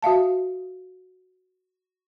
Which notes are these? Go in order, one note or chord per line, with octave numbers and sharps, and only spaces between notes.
F#4 E5 F5 A5